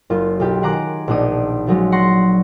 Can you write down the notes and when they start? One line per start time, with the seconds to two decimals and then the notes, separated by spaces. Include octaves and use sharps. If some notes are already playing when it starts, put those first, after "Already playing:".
0.10 F#1 F4
0.40 B1 F4 G4
0.62 D#3 G#4 F#5 A#5 D6 F#6
1.08 A#1 B2 D4 D#4 D#7
1.67 F3 F#3 G#3 C#4
1.92 F#5 C6 C#6 A#6 C#7